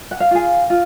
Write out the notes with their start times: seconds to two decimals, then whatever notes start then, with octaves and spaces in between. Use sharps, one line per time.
0.11 F#5
0.20 F5
0.31 F4 G#4
0.70 F4